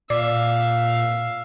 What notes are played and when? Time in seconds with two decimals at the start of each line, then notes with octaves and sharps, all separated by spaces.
0.10 A#2 D5 E5 F5 D6